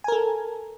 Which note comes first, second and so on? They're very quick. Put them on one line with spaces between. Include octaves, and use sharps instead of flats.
G#5 A#4 A4